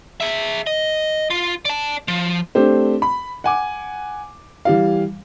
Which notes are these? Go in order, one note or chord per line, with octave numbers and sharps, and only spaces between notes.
G#4 E5
D#5
F4
D5 A5
F3
A3 C4 D4 G4 C5
B5
F#5 G#5 D6
E3 G3 F5